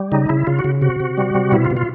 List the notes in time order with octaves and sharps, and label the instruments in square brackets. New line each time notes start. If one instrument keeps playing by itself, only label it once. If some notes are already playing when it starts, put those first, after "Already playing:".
Already playing: [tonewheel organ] G3
C#3 D#4
C#3 E4
C#3 F4
F#4
C#3
C3 F#4
C3
G3
C3
B2 E4
F4
B2
F4